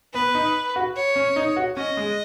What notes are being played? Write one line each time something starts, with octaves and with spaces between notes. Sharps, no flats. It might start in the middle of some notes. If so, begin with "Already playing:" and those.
B3 B4
D#4
F#4
C#5
C#4
D#4
F#4
C#4 D#5
G#3